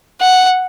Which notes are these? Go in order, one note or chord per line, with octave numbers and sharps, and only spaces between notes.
F#5